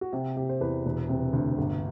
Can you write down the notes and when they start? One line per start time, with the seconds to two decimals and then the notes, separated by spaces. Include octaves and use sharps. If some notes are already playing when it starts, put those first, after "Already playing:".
0.01 F#4
0.12 C3 G4
0.36 C3 G4
0.49 C5
0.60 E2 B4
0.85 E1
1.09 C3
1.33 D2
1.58 G1